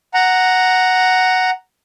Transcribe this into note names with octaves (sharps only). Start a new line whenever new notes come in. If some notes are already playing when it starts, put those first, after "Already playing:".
F#5 A#5